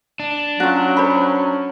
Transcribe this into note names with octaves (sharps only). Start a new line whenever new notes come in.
D4
F#3 C#4 F4 F#4
C5 B5